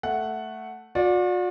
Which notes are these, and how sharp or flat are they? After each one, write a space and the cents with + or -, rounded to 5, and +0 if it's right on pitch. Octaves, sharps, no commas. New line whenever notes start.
A3 +0 F#5 +0
F#4 -45 D5 -5